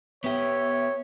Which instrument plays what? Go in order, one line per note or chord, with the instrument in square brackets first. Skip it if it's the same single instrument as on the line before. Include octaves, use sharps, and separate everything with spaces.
[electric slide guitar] B3 G4 [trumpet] C#5 [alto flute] E5